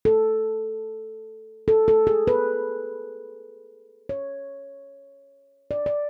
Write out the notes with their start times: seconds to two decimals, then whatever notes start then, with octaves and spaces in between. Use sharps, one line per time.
0.05 A4
1.68 A4
1.88 A4
2.07 G#4
2.27 B4
4.09 C#5
5.71 D5
5.86 D5